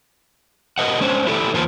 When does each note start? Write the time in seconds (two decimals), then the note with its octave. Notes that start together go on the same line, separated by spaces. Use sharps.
0.78 G4 A#4 B4 D#5 F#5
1.00 G#3 C#4 D4 C5
1.27 E4 G4 A4 B4 D5
1.54 E2 A#3 F4 B4 C5 A5